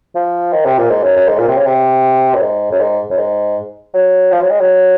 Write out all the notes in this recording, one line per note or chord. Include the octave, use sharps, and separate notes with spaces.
F3
D#3
C3
A#2
G#2
F#2
F#2
G#2
A#2
C3
C#3
C3
F#2
G#2
F#2
G#2
F#2
G#2
F#3
F3
F#3
G#3
F#3